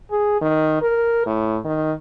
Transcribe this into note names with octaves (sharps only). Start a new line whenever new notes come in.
G#4
D#3
A#4
A2
D#3